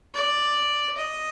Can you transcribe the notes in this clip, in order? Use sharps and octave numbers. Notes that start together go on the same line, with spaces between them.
D5
D#5